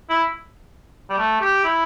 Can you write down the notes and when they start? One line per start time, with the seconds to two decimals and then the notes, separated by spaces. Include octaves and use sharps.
0.10 E4
1.10 G3
1.18 A3
1.41 G4
1.64 E4